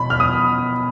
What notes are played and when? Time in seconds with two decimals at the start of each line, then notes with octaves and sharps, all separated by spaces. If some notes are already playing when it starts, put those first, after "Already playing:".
Already playing: B2 B5
0.10 F6
0.20 D#6